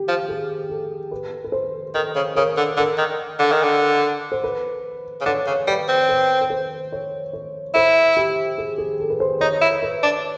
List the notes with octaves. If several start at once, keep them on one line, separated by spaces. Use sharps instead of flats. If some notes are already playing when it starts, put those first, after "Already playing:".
Already playing: G4
F3
G#4
A4
B4
B4
C5
D#3 A4
C#3
C#3 A#4
D3
D3 A#4
D#3
D3
D#3
D3
C5
B4
C#3
D3 C#5
C#3
G3 B4
C4
B4
B4
C5
C#5
C#5
E4 C5
G4
G#4
G#4
A4
B4
C5
D#4 C#5
E4
B4
D4